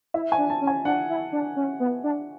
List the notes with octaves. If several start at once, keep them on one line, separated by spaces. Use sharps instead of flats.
E4 E5
G#5
D4
A5
C#4
G#5
D4 F#5
E4
D4
C#4
B3
D4